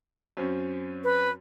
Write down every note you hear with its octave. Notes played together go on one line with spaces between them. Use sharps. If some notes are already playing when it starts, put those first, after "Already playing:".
F#2 C4 C#4
B4